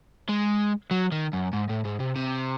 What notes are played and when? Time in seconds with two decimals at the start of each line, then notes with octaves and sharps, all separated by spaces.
0.29 G#3
0.91 F#3
1.12 D#3
1.33 F#2
1.53 G#2
1.69 A2
1.85 G#2
2.00 C3
2.16 C3